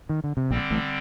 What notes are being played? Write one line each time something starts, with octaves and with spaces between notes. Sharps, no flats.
D#3
D3
C3
A#1 A#2 D3 G3 C4
A1 A2